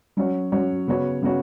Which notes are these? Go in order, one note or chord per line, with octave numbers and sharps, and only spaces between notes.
F#3 C#4 F#4 C#5
F#3 C#4 F#4 C#5
C#3 B3 F#4 C#5
C#3 B3 F#4 C#5